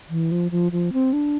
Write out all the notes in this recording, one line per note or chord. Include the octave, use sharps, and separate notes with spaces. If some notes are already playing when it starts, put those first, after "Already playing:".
E3
F3
F3
F3
C4
D4